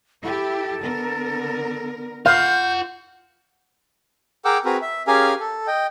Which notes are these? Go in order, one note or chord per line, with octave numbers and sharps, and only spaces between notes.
E4 G4 A4
D3 B3 A#4
F4 F5 F#5 G6
G#4 A#4 F#5 G5 D6 E6
C4 F#4 G#4 A#4 B4
E5
C#4 G4 G#4 A#4 F5 G#5
A4
D#5 G5